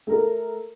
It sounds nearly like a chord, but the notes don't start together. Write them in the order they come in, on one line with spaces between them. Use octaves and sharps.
A3 A#4 A4